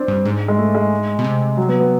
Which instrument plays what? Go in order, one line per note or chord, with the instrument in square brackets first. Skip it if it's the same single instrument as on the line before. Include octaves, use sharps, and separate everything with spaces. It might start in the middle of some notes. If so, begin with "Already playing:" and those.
Already playing: [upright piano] C4 D4
[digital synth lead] G2
G#2
[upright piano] G#3
A3
G#3
[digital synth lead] B2
C3
[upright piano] F#3
B3
B3